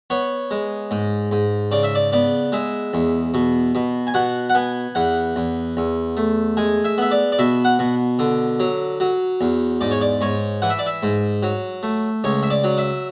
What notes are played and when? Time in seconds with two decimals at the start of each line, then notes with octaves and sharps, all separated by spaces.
0.10 B3 C#5
0.51 G#3
0.91 G#2
1.31 G#2
1.71 C#3 D5
1.83 E5
1.95 D5
2.12 B3 D5
2.52 G#3 E5
2.94 E2
3.34 B2
3.75 B2
4.07 G#5
4.14 B2 F#5
4.50 F#5
4.55 B3 G#5
4.95 E2 F#5
5.36 E2
5.77 E2
6.17 A3
6.57 G#3 G#5
6.84 E5
6.98 B3 E5
7.11 D5
7.32 D5
7.39 B2 E5
7.65 F#5
7.79 B2
8.19 D3
8.60 F#3
9.00 F#3
9.41 E2
9.81 G#2 D5
9.91 C#5
10.01 D5
10.21 G#2 C#5
10.62 E3 F#5
10.70 E5
10.79 D5
10.86 E5
11.03 G#2
11.43 F#3
11.83 A3
12.24 C#2 C#5
12.43 E5
12.50 D5
12.64 F#3
12.78 E5